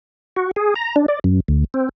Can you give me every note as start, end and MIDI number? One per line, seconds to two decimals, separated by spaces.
0.36 0.51 66
0.56 0.74 68
0.76 0.96 82
0.96 1.06 62
1.08 1.19 74
1.24 1.40 42
1.48 1.64 38
1.74 1.89 60